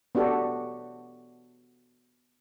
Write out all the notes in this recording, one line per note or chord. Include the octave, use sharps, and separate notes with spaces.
B3 D4 F#4 G4 A4